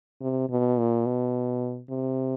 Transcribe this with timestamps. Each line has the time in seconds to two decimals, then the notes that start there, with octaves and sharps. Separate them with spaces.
0.21 C3
0.50 B2
0.78 A#2
1.06 B2
1.90 C3